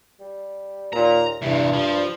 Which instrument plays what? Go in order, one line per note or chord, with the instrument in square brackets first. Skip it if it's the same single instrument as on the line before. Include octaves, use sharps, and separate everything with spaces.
[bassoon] G3
[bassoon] D#2 [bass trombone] A#2 [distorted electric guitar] A#5
[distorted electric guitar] E2 C3 [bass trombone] G2 [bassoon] E4
[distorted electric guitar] F3 [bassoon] G3